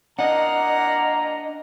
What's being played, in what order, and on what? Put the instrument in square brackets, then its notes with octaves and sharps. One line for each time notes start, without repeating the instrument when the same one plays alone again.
[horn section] A#2 A#3 A#5 [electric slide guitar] D4 D#5 [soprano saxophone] F#5